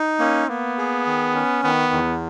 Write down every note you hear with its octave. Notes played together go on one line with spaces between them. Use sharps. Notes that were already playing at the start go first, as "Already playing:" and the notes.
Already playing: D#4
A#3 C#4
A#3 B3
G#4
D#3
C#4
D#3 B3
E2